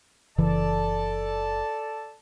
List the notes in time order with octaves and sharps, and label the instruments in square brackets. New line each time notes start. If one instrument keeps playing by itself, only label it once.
[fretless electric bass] F#1 C#3 E3 [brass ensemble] A4 D5 A5